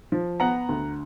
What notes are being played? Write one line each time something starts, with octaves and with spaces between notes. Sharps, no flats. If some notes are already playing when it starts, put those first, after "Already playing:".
F3
B3 F#5 A#5
D2